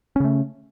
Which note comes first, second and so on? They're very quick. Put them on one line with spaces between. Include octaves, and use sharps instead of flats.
C#4 C#3 A3